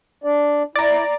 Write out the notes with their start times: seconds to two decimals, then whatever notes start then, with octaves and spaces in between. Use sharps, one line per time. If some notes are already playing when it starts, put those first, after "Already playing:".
0.24 D4 D5
0.76 E4 D5 A#5